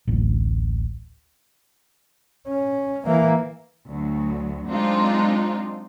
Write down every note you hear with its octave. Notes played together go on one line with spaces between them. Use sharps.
D1 A1
C#4
E3 A#3
D2 F#3
F#3 G#3 C4 D4 D#4 F4